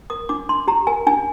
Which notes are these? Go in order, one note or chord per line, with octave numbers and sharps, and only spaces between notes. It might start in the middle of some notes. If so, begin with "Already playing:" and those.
A#4 D#6
D4 D6
D4 C6
G4 A#5
A#4 G#5
D4 G#5